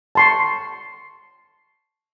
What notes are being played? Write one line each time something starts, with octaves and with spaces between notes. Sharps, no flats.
A5 C6 C#6